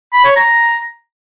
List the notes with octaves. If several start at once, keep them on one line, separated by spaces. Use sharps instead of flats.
B5
C#5
A#5